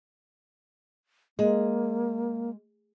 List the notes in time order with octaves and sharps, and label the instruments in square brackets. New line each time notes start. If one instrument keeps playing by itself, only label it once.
[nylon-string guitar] G#3 [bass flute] A#3